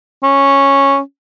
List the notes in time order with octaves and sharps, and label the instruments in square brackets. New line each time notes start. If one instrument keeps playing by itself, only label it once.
[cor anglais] C#4